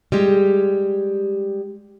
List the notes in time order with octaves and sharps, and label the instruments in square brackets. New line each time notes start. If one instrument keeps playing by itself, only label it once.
[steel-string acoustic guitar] G3 G#3 G4